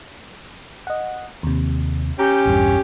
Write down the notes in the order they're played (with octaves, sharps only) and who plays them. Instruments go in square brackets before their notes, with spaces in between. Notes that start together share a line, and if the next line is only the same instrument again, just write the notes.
[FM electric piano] D#5 F#5
D#2 C3
[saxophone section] C#4 G4 [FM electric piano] A#5 G6
[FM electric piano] A#1 E2 G2